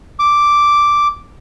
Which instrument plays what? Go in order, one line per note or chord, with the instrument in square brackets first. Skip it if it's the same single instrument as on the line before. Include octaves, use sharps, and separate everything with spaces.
[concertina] D6